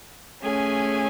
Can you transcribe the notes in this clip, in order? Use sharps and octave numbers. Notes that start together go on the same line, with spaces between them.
A3 C#4 G#4